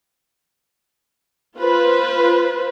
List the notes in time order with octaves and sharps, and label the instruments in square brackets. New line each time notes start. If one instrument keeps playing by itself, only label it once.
[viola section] F4 B4 C5